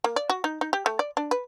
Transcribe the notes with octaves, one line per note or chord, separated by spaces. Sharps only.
A#3
D5
F#4
D#4
D#4
G4
A3
D5
D4
B4